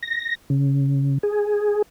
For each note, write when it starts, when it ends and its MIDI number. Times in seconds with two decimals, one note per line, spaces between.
0.03 0.35 94
0.50 1.18 49
1.23 1.82 68